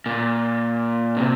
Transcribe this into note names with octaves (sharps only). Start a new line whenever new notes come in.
A#2
C3